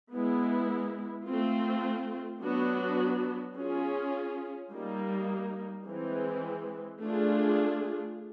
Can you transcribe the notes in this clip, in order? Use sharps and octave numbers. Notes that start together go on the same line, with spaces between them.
G#3 B3 E4
A3 C4 F4
F#3 B3 D4 F#4
C#4 F4 G#4
G3 A#3 D#4
E3 G#3 C4
A3 D4 F4 G#4